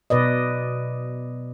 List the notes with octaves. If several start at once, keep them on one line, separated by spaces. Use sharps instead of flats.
B2 B4 D5 D#5